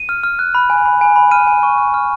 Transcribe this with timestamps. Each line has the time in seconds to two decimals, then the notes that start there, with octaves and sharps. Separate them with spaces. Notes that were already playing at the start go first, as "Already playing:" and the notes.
Already playing: D#7
0.09 F6
0.24 F6
0.39 F#6
0.55 B5
0.70 G#5
0.86 B5
1.01 G#5
1.16 B5
1.31 F6 D#7
1.47 G#5
1.63 C#6
1.78 F6
1.94 F6